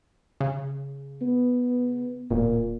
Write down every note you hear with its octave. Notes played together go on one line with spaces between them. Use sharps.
C#3
B3
D1 A#2